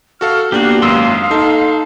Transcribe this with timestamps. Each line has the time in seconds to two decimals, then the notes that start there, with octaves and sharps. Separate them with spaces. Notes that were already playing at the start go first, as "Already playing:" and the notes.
0.21 F#4 A4 F5 F6
0.52 A#3 B3 D4 F#4 G4 F5
0.82 G#1 F#2 C6 D#6 E6
1.31 D#4 A4